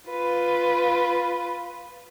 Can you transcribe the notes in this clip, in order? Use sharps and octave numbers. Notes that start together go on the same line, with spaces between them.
F4 B4